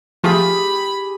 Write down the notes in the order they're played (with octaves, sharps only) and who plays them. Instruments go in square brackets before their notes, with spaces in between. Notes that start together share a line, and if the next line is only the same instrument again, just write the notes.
[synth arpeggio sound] F3 A3 F4 [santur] G4 G#4 [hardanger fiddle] B5